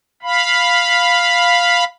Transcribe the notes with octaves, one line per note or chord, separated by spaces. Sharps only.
F5 B5